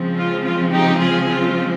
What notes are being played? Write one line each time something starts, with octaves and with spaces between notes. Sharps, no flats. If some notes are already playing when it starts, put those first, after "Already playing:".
Already playing: C#3 F3 G#3 C4
F4
F4
D#4 G4
F4 G#4
F4